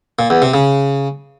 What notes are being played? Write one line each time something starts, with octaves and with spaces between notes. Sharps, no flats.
A#2
E2
C3
C#3